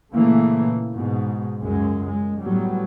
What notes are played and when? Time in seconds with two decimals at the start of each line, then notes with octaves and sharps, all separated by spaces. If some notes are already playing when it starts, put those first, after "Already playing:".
0.14 A#2 C#3 E3 A3 A#3
0.94 G#2 B2
1.60 C#2 F#2 G#3
2.08 G#3
2.43 A2 F#3 G3 B3